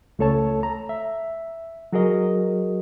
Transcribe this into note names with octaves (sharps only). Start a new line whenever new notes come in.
C#2 A3 A4 C#5 A5
A#5
E5
F#3 F#4 G#4 A#4 D#5